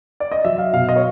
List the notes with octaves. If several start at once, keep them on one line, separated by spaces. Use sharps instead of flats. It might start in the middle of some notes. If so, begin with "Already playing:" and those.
D5
D#5
F#3 E5
F5
B2 F5
D#5
C#5